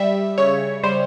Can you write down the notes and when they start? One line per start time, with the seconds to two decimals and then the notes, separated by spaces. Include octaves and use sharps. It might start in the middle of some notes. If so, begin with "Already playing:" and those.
Already playing: G3 E5
0.38 C#3 C#5
0.84 G3 C5